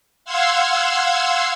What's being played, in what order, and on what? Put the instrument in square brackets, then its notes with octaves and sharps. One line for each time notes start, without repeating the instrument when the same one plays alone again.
[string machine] F5 F#5 C6 E6 G#6